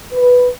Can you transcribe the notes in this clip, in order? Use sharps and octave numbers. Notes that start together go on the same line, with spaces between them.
B4